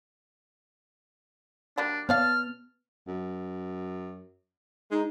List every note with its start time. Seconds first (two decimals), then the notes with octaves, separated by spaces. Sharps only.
1.78 F#3 G3 A#3 D4
2.09 B3 C#5 D5 F5 A5 F6
3.08 F#2
4.91 G#3 D#4